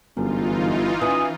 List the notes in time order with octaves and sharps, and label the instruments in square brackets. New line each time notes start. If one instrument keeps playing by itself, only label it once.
[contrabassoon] G1 [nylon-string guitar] F#2 [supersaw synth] E3 D#4 F4
[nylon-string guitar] E3 C#4 [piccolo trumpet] D#6